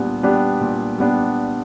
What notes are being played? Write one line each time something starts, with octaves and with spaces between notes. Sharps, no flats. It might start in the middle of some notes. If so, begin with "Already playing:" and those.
Already playing: A#2 G3 B3 D4
G3 B3 D4 G4
A#2
G3 B3 D4 G4